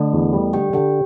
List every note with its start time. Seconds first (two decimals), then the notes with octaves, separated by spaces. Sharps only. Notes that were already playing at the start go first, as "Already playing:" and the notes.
Already playing: D3 A3 A4
0.14 E2
0.33 G3
0.53 D3 G4 G5
0.73 D3 G4 G5